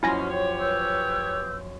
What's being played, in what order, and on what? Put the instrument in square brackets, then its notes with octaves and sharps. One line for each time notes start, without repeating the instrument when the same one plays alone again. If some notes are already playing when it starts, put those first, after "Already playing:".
[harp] F#2 F3 C6 [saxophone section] B2 C#4 [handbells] E4 G#5 A#6
[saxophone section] G4 C#5
[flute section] B4 E6 G6 [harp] C6